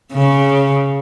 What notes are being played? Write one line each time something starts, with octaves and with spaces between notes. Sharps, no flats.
C#3